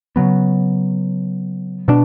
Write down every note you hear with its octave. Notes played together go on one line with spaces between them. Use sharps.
C#3 F#3 B3
B2 G3 D4